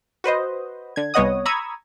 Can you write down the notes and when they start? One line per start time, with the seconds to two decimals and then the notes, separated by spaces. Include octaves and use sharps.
0.24 F#4 B4 C5 D#5
0.96 D3 G#6
1.14 C2 B3 C#5 D#5 F#5 D#6
1.45 A#5 B5 C#6 D#6 E6 G#6